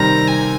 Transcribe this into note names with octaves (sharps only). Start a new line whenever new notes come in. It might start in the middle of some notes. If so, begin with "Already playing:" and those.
Already playing: C3 D#3 G3 C4 A#5
G#5